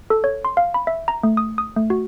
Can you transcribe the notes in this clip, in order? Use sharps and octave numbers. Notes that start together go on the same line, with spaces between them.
A4
C#5
C6
F5
B5
E5
A#5
A3
D#6
D#6
A3
F#4